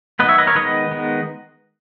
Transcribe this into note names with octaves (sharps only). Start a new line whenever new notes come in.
D#3 F#3 B3 B4 D#5
C#5 E5
B4 D#5
A#4 C#5
D#3 G#3 B3 B4 D#5
D#3 G#3 B3